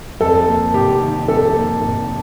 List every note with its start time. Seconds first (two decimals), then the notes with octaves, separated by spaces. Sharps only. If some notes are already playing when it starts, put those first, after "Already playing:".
0.20 F2 A4
0.47 A#3
0.74 F1 G4
1.01 D#3
1.28 F2 A4
1.55 A#3
1.81 F1